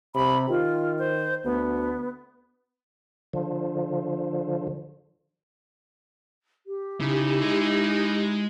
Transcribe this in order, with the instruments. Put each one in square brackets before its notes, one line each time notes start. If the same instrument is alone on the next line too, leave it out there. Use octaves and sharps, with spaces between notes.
[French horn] C3 [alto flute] B5
[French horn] D#3 [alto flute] F4
[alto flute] C5
[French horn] D2 [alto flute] B3
[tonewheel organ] D3 F3
[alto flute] G4
[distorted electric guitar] C#3 [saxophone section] D#4 E4
[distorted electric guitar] G#3 G#4